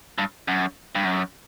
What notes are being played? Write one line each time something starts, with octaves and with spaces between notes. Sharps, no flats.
G2
F#2
G2
F#2